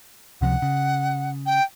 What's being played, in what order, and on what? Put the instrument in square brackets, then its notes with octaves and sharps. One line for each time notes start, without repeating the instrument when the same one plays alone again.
[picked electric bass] C#2 C3 F3 [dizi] F#5
[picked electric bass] C#3
[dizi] G5